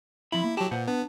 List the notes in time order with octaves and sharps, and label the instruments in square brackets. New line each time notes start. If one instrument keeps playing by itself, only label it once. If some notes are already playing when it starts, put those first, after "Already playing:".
[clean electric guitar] F3 C4 B5 [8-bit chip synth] E4
[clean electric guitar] A#3
[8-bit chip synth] F#3 G4 [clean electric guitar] E4 A5
[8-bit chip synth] A#2 [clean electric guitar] B4 C5 F#5
[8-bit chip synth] B3 [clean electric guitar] D4